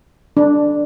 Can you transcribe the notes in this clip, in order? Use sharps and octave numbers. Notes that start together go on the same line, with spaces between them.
D4